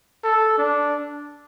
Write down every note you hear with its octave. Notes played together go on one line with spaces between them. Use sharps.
A4
D4